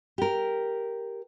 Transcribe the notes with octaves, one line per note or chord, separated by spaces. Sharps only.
G4 A#4